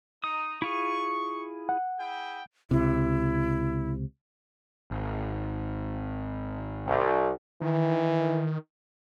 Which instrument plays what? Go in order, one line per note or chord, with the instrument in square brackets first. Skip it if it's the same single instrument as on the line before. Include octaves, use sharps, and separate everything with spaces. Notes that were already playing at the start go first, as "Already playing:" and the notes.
[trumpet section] D#4 [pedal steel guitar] D#6
[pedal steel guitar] E4 F4 G#4 [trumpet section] C#6
[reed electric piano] F#5
[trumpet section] E4 G#4 G5
[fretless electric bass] C#2 C3 [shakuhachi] E4
[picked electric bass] G#1
[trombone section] C2
[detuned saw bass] D#3 [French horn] E3